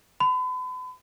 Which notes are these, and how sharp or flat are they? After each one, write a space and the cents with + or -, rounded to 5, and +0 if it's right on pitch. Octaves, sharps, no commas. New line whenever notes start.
B5 +40